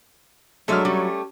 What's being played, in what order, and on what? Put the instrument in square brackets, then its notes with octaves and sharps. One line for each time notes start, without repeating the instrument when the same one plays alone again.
[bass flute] F#3 [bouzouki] G#3 A4 E5 [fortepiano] A3 D4 F6
[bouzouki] G3 A3 [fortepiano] C#4